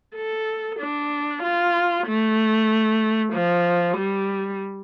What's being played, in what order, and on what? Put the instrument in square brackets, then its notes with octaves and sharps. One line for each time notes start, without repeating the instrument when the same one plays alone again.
[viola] A4
D4
F4
A3
F3
G3